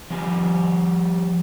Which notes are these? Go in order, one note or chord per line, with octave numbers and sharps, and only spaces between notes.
F3 G3 G#5